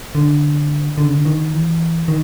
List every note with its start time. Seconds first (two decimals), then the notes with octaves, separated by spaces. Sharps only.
0.15 D3
0.98 D3
1.06 C#3
1.14 D3
1.25 D#3
1.53 E3
2.08 D#3